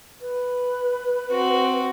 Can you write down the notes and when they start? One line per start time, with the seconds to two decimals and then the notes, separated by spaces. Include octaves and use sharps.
0.21 B4
1.30 C4 F#4